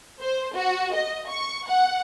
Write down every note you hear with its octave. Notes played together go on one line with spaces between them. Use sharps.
C5
F#4
D#5
C#6
F#5